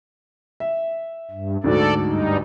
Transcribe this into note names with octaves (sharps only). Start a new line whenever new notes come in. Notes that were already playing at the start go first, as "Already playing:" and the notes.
E5
G2
D2 G#2 F#4 A4 D5
G2 G3 D#4